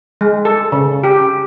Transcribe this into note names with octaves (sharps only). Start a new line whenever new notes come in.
G#3
A4
C#3
G4